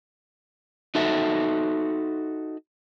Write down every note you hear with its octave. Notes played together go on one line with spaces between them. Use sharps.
D#4 F#4 A4 E5